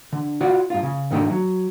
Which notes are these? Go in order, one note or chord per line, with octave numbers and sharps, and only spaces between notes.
D3
F4 F#4 D5 F#5
G2 F4
C#3
D2 G#2 D#3 A3 D4 D#4
F#3